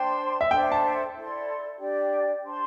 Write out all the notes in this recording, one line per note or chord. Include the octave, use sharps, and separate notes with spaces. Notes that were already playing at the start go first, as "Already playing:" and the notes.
Already playing: D4 C5 G5 A5 C6
E5
D4 A4 C5 E5 G5
A5
E4 A4 D5 C6
D4 G4 D5 G5
D4 C5 A5 C6